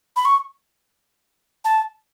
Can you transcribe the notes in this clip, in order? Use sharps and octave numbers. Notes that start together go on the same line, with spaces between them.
B5
C#6
A5